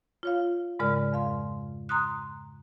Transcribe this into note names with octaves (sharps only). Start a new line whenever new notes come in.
F4 C#5 F5
G#2 C#3 G#3 A#4 D5 F6
F2 F5 C6
A#5 C6 D#6 F#6